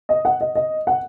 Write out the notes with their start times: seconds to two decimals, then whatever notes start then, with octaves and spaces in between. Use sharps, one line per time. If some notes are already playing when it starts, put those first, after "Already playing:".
0.09 D#5
0.25 F#5
0.41 D#5
0.55 D#5
0.87 F#5